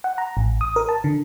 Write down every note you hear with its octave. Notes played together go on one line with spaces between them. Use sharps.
F#5
A#5
A1
D#6
A#4
A5
D3